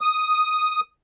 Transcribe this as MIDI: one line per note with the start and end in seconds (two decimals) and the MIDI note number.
0.01 0.80 87